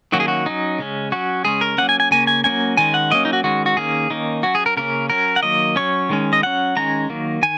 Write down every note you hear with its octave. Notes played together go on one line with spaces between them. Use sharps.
D#3 F#3 A#3 C#4 F#4
G#4
F#4
F#3 C#4 D#4
C#3 G#3 C#4
F#3 C#4 F#4
C#3 G#3 C#4 G#4
A#4
F#3 A#3 C#4 F#5
G#5
G#5
C#3 A#3 C#4 G#5
G#5
F#3 A#3 C#4 G#5
D#3 G#3 C#4 G#5
F#5
F#3 A#3 C#4 D#5
D#4
F#4
D#3 G#3 C#4 F#4
F#4
D#3 A#3 C#4 G#4
D#3 A#3 C#4 D#4
F#3 C#4 F#4
G#4
A#4
C#3 A#3 C#4 A#4
F#3 C#4 A#4
F#5
D#3 F#3 A#3 D#5
F#3 C#4 C#5
D#3 G#3 C#4
D#5
F#3 C#4 F#5
D#3 G#3 C#4 A#5
D#3 F#3 A#3
D#3 G#5